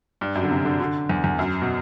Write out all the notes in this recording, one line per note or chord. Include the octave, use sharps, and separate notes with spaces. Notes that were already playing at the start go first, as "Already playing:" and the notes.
G2
F#2
D3
C3
D3
D3
E2
E2
F#2
B2